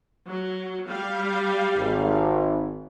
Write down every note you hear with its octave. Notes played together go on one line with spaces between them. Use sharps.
F#3
G3 F5
G#1